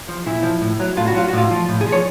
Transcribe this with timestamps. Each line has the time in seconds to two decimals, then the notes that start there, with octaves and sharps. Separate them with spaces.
0.09 F3
0.26 A#2 E4
0.43 F3
0.61 A2
0.80 F#3
0.96 A2 F4
1.08 F#4
1.15 F#3 F4
1.29 F#4
1.33 A2 F4
1.51 F3
1.68 A2
1.81 G#4
1.86 F3
1.92 C#5